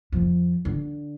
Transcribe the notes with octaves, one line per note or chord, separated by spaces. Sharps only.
F2 F3
D3